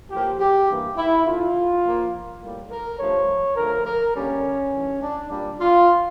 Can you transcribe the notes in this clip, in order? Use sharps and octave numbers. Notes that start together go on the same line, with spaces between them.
A2 F3 A#3 G4
G4
G2 E3 A#3
E4
D3 A3 F4
A#2 F3 A#3
A2 G3 A#3
A#4
G2 F3 A3 C#5
D3 F3 A3 A#4
A#4
D3 G3 A#3 C#4
G2 E3 A3
D4
A#2 G3 A#3 D4
F4